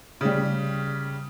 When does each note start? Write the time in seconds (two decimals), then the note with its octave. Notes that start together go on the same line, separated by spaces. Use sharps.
0.21 C#3 G3